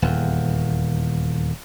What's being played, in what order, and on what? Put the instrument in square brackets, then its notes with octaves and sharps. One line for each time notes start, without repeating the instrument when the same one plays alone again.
[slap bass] D#1 E2